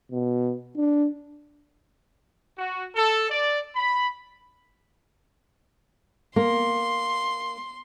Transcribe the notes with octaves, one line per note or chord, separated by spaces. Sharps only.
B2
D4
F#4
A4
D5
B5
A#3 C6